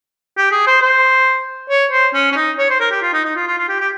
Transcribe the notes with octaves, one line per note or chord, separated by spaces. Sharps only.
G4
G#4
C5
C5
C#5
C5
C#4
C#4
D#4
C#5
C5
A#4
G4
F4
D#4
D#4
F4
F4
F4
G4
G4